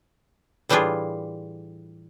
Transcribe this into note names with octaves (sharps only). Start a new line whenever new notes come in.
A2 E3 G3 D4 F4 G#4